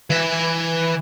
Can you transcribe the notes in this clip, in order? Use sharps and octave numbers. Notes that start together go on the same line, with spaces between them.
E3 E5